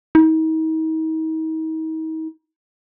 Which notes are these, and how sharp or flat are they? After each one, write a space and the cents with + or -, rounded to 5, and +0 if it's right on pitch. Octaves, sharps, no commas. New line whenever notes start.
D#4 +40